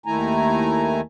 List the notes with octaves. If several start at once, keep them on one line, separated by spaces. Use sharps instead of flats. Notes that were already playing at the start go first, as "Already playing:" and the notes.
D#2 D#3 A3 E4 G#5 A#5